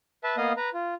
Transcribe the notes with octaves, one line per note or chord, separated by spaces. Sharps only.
B4 E5 A5
A#3 B3 D#5 F5 D#6
B4 A#5
F4